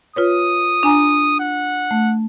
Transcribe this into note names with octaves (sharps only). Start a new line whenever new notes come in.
F4 B4 C#5 D#6
D4 G#5 A#5
F#5
A3